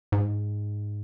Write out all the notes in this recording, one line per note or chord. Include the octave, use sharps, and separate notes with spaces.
G#2